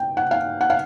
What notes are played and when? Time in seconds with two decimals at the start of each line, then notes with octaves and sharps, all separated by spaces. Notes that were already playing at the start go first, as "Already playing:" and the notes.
Already playing: G5
0.17 F#5
0.31 F5
0.61 F#5
0.70 F5